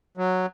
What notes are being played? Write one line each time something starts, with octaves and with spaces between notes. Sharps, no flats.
F#3